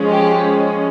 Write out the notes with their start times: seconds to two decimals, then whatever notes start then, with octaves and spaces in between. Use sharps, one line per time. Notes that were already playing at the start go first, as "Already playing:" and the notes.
Already playing: F3 G#3 C#4
0.09 G4